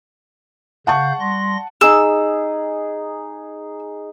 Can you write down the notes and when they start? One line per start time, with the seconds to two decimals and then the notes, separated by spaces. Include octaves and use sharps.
0.87 C#3 F5 F#5 A5 C#6 G6
1.20 G3 C6 A#6
1.81 D#4 G#4 E6